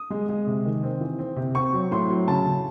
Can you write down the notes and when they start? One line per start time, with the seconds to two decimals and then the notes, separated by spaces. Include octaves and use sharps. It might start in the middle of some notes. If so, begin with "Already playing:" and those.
Already playing: D#6
0.10 G#3
0.29 G#3
0.47 C3
0.65 D#3
0.83 C4
1.01 E3
1.19 C4
1.36 C3
1.55 C4 C#6
1.73 F#3
1.91 A2 C6
2.10 F#3
2.27 C#3 A5
2.46 C#3